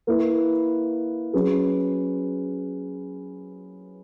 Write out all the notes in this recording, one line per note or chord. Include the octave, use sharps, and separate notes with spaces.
A#3 E4 B4
F#3 C#4 G#4 B4